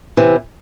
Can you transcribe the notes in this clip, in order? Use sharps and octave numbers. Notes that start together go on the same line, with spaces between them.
C3 E3